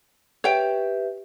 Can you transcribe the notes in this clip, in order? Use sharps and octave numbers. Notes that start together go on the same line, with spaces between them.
G4 B4 C#5 E5 G5